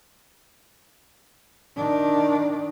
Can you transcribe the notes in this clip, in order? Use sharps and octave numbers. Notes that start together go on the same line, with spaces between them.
D#3 D4